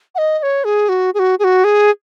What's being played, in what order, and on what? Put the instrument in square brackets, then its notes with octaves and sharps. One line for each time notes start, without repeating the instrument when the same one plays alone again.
[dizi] F#5
D#5
D#5
C#5
G#4
F#4
G#4
F#4
G#4
F#4
G#4